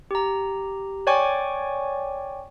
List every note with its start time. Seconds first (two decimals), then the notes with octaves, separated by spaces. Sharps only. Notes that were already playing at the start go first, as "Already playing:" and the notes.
0.11 G4 A#5
1.07 C#5 D5 G5 G#5 C#6 D6